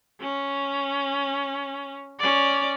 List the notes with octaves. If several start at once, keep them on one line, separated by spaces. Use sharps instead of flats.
C#4
C#4 D5